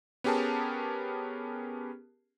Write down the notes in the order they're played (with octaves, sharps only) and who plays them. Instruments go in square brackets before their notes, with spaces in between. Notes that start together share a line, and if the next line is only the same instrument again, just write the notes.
[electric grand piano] B3 C#4 G4 G#4 A#4 A5